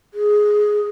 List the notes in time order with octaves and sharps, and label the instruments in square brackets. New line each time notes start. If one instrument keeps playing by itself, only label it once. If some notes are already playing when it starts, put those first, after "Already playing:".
[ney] G#4